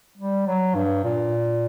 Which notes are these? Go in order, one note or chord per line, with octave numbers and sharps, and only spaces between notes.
G3
F#3
G2
A#2